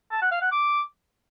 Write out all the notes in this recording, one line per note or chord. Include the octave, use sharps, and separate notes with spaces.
A5
F#5
F5
F#5
D6